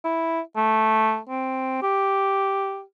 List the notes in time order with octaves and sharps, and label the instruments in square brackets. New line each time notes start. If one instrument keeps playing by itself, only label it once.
[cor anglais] E4
A3
C4
G4